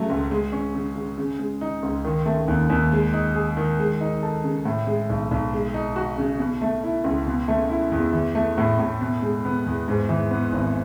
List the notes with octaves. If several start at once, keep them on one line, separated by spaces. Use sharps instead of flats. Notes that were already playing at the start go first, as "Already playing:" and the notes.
Already playing: C#3 F#3 A3
C#2
G#3
C#4
C#3
C#3
C#3
G#3
D#4
C#2
D#3
A3
D#2
D#2
G#3
D#4
G#4
D#3
G#3
D#4
A4
C#3
A2
G#3
B1
B1
G#3
D#4
F#4
C#3
B2
A3
E4
C#2
B2
A3
E4
E2
E3
A3
A2
A2
B2
G#3
B3
E2
G#2
E3
B3
G#1